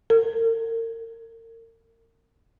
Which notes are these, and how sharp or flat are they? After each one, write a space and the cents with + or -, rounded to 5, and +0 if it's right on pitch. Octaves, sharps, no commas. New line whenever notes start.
A#4 -40